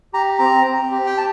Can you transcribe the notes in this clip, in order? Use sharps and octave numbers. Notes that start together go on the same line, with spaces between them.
G4 A#5
C4 A#5
C4
G4
G5
A5